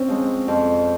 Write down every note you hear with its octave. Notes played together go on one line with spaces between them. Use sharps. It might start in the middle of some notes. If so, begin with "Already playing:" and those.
Already playing: C4 C#4
F3 G#3
F2